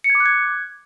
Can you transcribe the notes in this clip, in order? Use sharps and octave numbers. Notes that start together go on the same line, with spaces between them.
C#7
G#6
D6
F#6
G#6